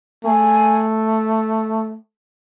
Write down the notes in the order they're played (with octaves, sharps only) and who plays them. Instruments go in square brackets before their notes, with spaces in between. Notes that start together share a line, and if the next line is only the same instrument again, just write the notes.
[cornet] A3 [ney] G#5